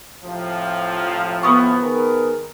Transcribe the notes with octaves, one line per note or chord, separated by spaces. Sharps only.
A2 C3 F3
B3 C#6
D#3 G#4 A#4